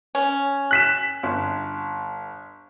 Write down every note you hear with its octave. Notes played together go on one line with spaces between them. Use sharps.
C#4
F#6 B6 E7
G1